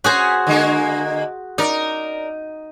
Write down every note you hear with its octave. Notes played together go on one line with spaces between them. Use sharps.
C#4 F#4 G#4 C5
D3 G#3 A#3
D#4 A#4 D5